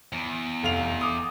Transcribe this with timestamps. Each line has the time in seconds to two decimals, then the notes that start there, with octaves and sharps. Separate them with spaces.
0.13 E2
0.63 F1 F5 F7
1.01 D6 D#6